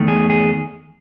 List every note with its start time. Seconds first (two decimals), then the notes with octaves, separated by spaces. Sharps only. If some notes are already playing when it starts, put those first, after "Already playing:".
Already playing: E2 D#3 A3
0.08 G#4
0.30 G#4